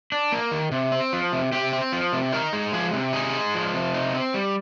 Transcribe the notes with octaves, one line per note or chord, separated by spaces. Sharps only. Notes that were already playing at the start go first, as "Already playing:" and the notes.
D4
A#3
D#3
C3
C4
F3
C3
C3 G4
C4
F3
C3
D#4 A#4
G#3
F3 G#4
C3
D#4 G#4
G#3
F3
C3
D#4
C4
G3